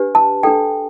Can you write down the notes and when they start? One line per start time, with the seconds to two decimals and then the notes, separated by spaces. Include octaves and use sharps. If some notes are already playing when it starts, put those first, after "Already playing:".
Already playing: D4 G4 B4
0.15 A5
0.43 D4 A4 G5